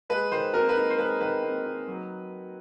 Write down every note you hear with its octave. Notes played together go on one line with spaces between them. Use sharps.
G#3 B4
D#3 C5
C4 A#4
B4
D#4
C5
G#3 B4
D#3 B4
C4
D#4
F#3